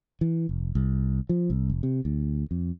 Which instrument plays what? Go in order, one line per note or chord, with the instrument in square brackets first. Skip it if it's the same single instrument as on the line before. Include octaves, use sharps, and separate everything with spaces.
[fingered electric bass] E3
F1
C2
F3
C2
F1
C3
D2
F2